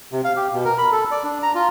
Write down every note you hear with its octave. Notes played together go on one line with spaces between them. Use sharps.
C3
F5
G4
B2
A#4
B5
A4
D5
D4
A#5
F4